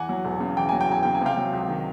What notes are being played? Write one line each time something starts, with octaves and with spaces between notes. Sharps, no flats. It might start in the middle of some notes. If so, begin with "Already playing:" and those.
Already playing: E2 F#5 G#5
F#3
E1
C#3
E2 G5
F#3 G#5
G5
E1 G#5
C#3 G5
G#5
C3 F5 G5
F#3
C#2
D#3